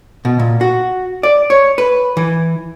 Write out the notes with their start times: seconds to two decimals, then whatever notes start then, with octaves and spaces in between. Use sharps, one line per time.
0.25 B2
0.39 A#2
0.61 F#4
1.23 D5
1.50 C#5
1.78 B4
2.17 E3